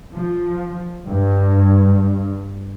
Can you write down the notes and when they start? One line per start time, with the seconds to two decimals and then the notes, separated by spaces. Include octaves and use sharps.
0.13 F3
1.08 G2